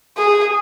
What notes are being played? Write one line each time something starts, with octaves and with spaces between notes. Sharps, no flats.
G#4